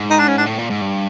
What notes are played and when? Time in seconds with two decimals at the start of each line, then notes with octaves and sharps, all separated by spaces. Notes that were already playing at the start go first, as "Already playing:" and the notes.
Already playing: G#2
0.10 D#4
0.19 D4
0.28 C#4
0.38 D4
0.46 A2
0.58 A#2
0.70 G#2
0.81 G2